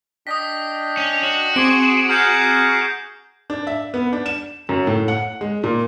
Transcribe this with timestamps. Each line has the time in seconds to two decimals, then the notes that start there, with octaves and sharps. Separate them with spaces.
0.27 D4 D#5 G5 D#6 B6
0.97 C#4 F7
1.23 F#4
1.56 C4 G#4 C6 D6 D7
2.09 G#4 F#5 A#5 F6 G6 C7
3.50 D4
3.67 E5
3.94 B3
4.13 D4
4.26 E7
4.69 F#2
4.87 A2
5.08 F#5
5.41 G#3
5.64 A#2